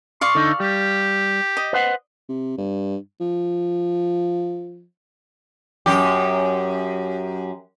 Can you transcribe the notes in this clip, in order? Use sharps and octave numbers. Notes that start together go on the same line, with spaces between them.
D5 F5 C6 C#6
D3 D#4 A4
G3 G4
D#5
B4 C5 F#5
C3
G2
F3
F#2 G4